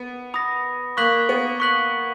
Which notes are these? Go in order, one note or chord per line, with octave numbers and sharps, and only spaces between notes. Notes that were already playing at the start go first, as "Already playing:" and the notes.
Already playing: B3
B5 D#6 A#6
A#3 C#6 F#6 B6 F#7
B3
C#6 F#6 B6 F#7